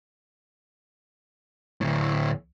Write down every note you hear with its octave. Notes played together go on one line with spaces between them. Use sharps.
D2 A2